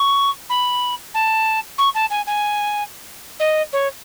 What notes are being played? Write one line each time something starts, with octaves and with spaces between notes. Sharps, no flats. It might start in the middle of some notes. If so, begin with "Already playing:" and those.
Already playing: C#6
B5
A5
C#6
A5
G#5
G#5
D#5
C#5